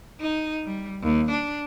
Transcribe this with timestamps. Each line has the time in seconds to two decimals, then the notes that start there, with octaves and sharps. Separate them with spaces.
0.21 D#4
0.66 G3
1.02 D#2
1.31 D4